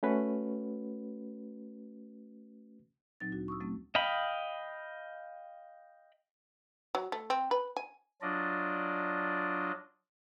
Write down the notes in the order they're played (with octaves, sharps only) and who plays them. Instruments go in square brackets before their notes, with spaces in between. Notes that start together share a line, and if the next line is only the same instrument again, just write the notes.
[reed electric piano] A3 C#4 F#4 B4
[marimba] A#2 F#3 C4 D#4 A6
D2 D4 F#4
C#6 D#6 E6
F#3 A3 C4 C#4
[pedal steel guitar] D#5 F5 G5 B5
[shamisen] F#3
A3
C4
B4
G#5
[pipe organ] F#3 D4 F4 D5 D#5